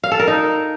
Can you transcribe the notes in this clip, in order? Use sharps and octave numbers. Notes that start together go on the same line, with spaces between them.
F5
A4
A#4
D#4